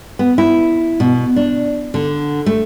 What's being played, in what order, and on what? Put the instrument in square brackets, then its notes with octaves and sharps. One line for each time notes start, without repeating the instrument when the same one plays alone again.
[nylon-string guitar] B3
E4
B2
D4
D3
A3